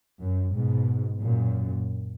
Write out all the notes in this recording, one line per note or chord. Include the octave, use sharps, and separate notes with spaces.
F#2
G#2 B2
F#2 A#2